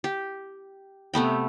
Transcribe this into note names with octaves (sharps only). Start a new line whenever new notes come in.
G4
C3 A3 B3 G5